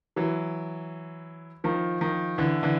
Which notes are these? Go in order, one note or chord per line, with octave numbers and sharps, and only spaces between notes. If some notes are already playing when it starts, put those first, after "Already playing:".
E3 F#3
D#3 F3
D#3 F3
D3 E3
D3 E3